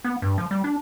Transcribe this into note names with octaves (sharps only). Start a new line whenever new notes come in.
B3
G2
F3
G3
D4